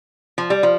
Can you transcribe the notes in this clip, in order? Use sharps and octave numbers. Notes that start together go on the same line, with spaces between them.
F3
G3
F3